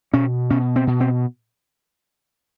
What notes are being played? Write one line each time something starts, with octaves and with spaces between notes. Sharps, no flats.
B2 C#4
B2 C#4
C4
B2
C4